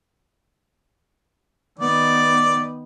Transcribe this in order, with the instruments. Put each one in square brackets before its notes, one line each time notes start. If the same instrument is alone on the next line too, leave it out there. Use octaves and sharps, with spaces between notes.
[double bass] D#3 B3 [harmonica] D5